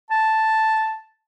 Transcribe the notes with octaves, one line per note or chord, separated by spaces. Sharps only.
A5